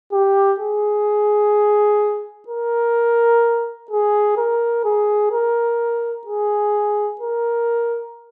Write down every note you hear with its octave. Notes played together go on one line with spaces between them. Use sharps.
G4
G#4
A#4
G#4
A#4
G#4
A#4
G#4
A#4